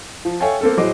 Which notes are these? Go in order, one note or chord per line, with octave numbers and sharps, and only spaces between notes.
F3
A4 C#5 E5 F5 G5 G#5
A#3 C4 A4
A2 F#3 G#4 C5 D#5 D6